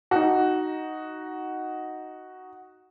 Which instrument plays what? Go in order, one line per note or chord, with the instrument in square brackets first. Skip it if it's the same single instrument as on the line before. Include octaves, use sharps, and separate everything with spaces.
[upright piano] D#4 F#4